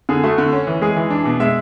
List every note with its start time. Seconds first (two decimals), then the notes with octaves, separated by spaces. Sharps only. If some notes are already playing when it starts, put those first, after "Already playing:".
0.09 D3 G#4
0.23 A3 F#4
0.38 D3
0.52 C#4
0.67 E3
0.81 G#3 G#4
0.97 E3
1.10 D4
1.25 B2
1.40 G#3 E5